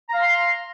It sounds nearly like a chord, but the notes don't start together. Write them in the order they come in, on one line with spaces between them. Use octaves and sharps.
A#5 F5 C6